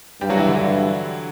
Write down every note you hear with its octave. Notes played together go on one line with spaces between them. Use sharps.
G2 G3 G4
F#3 F#4
E3 E4
D3 D4
G2 E3 E4